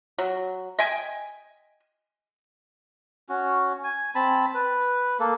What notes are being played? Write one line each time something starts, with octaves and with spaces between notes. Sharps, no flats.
F#3
D#5 E5 G5 G#5
C#4 F#4
G#5
C4 A5 B5
B4
A#3 A4